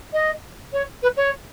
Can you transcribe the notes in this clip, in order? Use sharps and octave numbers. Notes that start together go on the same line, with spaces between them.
D#5
C#5
B4
C#5